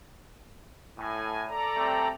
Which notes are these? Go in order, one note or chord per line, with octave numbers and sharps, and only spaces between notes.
A2 G#5
A4 D5 A#5
G3 A3 C4